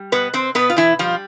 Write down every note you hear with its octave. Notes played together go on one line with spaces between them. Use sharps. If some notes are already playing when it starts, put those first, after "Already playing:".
Already playing: G3
B2 B3 B4
C4 C5
B2 B3 B4
F4
E3 E4
F3 G3 F4